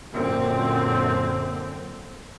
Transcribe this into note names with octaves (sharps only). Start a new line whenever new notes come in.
F#2 A#2 D3 C4